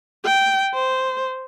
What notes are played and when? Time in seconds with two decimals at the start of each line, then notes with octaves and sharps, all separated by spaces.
0.25 G5
0.74 C5